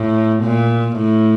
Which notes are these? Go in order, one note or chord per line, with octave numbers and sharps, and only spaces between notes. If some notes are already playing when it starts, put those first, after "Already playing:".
Already playing: A2
A#2
A2